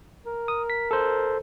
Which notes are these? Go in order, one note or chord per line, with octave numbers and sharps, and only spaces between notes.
A#4
D#6
B6
A4 C5